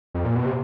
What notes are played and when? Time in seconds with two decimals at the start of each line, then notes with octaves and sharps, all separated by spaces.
0.14 F2
0.25 A#2
0.35 B2
0.45 C3